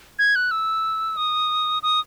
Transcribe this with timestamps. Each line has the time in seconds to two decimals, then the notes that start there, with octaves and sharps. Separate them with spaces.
0.19 G#6
0.36 F#6
0.51 E6
1.17 D#6
1.83 D#6